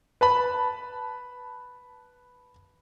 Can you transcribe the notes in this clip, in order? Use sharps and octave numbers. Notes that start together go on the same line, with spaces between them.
B4 A5 B5